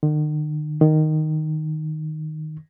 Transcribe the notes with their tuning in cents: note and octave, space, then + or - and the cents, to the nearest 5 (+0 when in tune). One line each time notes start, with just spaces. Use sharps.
D#3 -45
D#3 -5